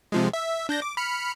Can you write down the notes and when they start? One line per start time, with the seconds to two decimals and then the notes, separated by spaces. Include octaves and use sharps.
0.12 C3 F3 G#3
0.33 E5
0.69 D4 G6 A#6
0.82 D6
0.97 B5 F6 C#7